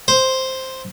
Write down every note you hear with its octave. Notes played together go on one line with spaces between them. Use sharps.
C5